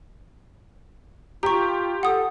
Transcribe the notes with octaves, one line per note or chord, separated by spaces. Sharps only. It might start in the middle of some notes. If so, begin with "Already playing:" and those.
F4 G4 A#5 C#6
A4 F#5 D#6